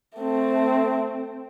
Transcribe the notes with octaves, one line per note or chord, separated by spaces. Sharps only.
A3 C4